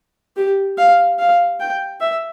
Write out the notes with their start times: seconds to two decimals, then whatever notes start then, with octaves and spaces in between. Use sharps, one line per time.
0.36 G4
0.78 F5
1.19 F5
1.60 G5
2.01 E5